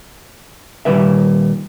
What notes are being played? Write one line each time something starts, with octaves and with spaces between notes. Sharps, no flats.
A#2 D#3 G3 B4 E5